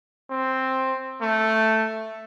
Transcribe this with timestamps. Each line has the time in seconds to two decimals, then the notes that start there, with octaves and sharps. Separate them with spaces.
0.30 C4
1.21 A3